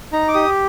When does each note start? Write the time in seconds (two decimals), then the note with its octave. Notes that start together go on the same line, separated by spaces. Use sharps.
0.12 D#4 A#5
0.28 D6
0.34 G4 D#6